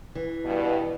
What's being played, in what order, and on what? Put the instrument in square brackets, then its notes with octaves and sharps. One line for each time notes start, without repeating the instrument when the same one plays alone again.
[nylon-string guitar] E3
[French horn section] G2 B2